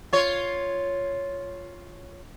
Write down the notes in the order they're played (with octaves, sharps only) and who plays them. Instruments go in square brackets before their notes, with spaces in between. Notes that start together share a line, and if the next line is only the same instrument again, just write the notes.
[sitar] F4 C#5